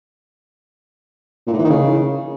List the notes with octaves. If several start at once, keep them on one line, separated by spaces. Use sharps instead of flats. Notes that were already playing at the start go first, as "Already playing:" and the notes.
A#2
A2
E3
D#3
C#3